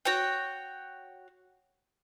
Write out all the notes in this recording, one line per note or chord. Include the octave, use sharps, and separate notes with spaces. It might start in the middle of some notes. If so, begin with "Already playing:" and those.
F#4 C#5 G5